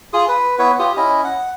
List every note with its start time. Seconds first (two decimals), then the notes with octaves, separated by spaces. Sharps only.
0.13 F4 G#4 D#6
0.28 B4
0.59 B3 E4 B4 C#5
0.79 F4 G4 D#6
0.97 C#4 E4 D#5
1.24 F#5